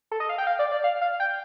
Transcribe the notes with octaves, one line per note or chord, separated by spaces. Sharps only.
A4
D#5
F5
G5
F5
D5
D5
F5
F5
G5